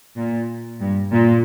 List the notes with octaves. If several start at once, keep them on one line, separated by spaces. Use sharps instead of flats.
A#2
G2
A#2